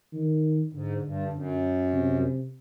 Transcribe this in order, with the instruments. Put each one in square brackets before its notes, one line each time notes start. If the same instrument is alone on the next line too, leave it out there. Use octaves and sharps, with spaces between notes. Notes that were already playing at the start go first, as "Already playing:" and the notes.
[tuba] D#3
[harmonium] G#2 [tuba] D3
[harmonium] G2
F#2
[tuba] C3